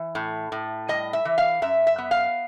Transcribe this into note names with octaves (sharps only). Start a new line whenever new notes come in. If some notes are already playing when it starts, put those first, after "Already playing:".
Already playing: E3
A2
A2
G3 D#5
E5
E3
F5
F#2 E5
E5
B3
F5